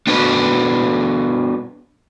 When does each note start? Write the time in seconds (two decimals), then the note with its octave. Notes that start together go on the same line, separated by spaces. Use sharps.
0.07 B3 D4 F#4 B4